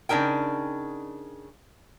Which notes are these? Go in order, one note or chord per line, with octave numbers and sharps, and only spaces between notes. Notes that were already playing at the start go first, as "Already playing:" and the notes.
C#3 D4 D#4 A#4 G5